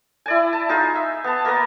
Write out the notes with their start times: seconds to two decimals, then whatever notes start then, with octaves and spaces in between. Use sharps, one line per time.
0.26 E4 D5 G#5
0.53 A5
0.69 D#4 F4 G#4
0.95 E5
1.24 B3 A5
1.45 A#3 A#4 B4 D#5